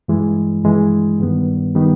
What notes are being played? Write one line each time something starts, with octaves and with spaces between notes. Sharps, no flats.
G2 E3 G#3
G2 E3 G#3
G2 D#3 G3 B3
D#3 G3 B3